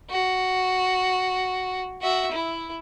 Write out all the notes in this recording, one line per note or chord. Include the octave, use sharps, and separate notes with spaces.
F#4
F#4 E5
E4